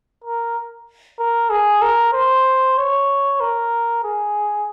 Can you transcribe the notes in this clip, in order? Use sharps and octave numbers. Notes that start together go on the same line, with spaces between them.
A#4
A#4
G#4
A#4
C5
C#5
A#4
G#4